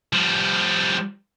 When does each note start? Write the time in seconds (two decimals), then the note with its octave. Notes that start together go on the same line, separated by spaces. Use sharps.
0.13 F3 G3